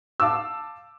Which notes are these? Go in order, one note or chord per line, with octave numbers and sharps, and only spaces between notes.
F5 A5 D6 E6